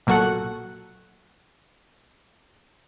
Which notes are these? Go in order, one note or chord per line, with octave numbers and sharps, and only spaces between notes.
B1 A#2 F#3 F#4 A4 F#5